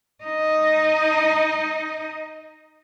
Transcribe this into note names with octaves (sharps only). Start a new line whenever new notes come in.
D#4 D#5